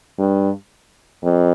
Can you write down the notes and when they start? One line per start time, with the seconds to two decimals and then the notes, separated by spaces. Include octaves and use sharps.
0.19 G2
1.23 F2